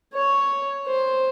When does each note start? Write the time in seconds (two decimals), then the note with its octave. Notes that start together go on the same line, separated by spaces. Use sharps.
0.13 C#5
0.87 C5